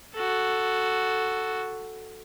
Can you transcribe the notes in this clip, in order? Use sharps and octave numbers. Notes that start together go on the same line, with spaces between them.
F#4 A4